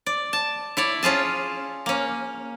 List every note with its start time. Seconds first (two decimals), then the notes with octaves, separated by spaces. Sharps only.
0.06 D5
0.33 A5
0.77 E4 C#5 D5
1.03 C#4 F4 G#4 A5
1.86 A#3 C#4